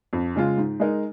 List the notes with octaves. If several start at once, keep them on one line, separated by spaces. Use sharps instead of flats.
F2
C#3 G#3 F4
G#2
G#3 D#4 A#4